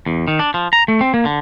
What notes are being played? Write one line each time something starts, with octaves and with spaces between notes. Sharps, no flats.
E2
D#3
D4
F3
A#5
A3
C4
A#3
D3